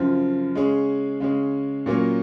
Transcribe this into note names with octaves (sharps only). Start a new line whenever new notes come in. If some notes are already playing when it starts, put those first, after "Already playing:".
Already playing: F#2 C#3 F3 C4
C#3 G#3 C#4 G#4
C#3 G#3 C#4 G#4
A#2 F#3 A#3 C#4